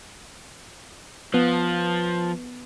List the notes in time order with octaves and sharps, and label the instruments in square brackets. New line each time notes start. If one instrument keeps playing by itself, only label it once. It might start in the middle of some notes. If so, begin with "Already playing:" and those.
[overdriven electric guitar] F3 [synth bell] B3 B4